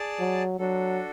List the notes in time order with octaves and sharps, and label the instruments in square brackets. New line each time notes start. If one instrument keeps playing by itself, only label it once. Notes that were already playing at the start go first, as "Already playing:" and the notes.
Already playing: [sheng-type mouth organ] G#4 D5 A5
[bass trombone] F#3
[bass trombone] F#3 [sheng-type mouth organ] D4 F#4 A4